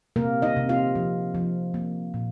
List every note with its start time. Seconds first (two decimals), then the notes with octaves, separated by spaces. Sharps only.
0.16 C3 A#3 A#4
0.42 D#4 D#5
0.56 C3
0.69 F4 F5
0.95 F3
1.35 F3
1.74 A#3
2.14 A#2